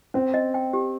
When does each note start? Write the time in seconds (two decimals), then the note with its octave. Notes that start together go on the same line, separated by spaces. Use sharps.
0.14 C4 C#4
0.34 D#5
0.54 G5
0.73 G4